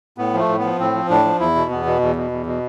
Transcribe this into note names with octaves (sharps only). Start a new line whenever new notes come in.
A2 B3
F3
A3
A2
F3 B3
A2 C4
F3
A2 D4
F3
E2 E4
B2
E2 B3
B2
E2
B2
E2
B2